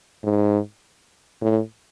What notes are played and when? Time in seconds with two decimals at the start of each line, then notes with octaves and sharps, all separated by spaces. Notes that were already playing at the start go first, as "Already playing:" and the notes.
0.24 G#2
1.41 A2